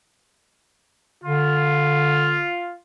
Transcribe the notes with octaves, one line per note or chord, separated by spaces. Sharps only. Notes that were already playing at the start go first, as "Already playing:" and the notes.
D3 F4